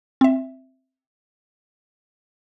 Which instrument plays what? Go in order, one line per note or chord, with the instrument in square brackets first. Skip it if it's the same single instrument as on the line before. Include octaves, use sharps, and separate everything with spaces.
[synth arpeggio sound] C4 E5